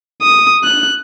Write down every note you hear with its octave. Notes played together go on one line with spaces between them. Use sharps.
D#6
F#6